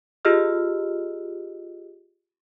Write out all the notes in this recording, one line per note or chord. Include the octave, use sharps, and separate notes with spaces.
F4 G4 G#4 D#5 E6 F6